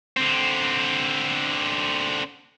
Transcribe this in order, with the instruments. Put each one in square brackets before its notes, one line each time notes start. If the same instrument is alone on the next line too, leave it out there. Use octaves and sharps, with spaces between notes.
[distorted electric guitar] D3 C4